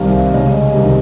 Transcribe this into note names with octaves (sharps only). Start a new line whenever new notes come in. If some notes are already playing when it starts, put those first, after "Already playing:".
Already playing: C2 C3 D#3 F5
C#2 C#3 D#5
C2 C3 D#3